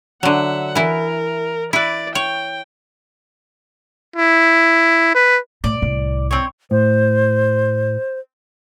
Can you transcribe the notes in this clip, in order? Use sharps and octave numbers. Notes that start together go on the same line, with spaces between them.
D3 F#3 E5 F#5
E3 E4 A#4
E4 B4 D5
C#5 G5
E4
B4
A2 D5
C2 A2
C4 C#5
A2 C5